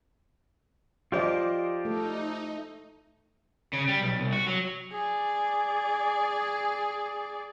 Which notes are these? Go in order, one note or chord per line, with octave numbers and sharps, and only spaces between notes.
F3 F4 G4 C5 D5 D#5
A3 D#4 A4
C#3
G3
B1
C2
F#4
F#3
G#4 D5